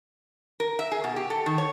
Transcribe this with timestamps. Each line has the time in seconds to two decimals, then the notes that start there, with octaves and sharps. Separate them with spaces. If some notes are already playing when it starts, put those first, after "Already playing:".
0.60 A#4
0.79 E5
0.92 G#4
1.04 B2
1.16 G4
1.30 A4
1.46 D#3
1.58 C#5